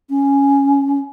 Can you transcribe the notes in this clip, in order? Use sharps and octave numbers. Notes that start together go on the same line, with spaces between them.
C#4